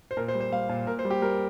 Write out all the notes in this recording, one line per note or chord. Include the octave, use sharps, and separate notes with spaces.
C5
A#2 A#4
C5
G3
C5
G3 F5
A#2
A#2 A#4
C5
G3
G4
G3 A#4